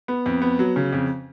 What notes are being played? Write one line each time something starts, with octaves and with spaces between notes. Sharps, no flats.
B3
F2
B3
F#3
C#3
F2